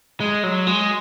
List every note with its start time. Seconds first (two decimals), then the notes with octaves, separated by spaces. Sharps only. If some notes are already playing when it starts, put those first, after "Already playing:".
0.20 G#3
0.43 F#3
0.67 G#3